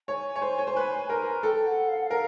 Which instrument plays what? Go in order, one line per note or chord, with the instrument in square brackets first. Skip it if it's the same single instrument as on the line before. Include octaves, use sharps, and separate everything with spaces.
[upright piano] C#5 [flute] G#5
[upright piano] C#5
C5
C#5
C5
B4
A#4
[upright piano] A4 [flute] G5
[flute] F#5
F5
F#5
[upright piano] A#4 [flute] F5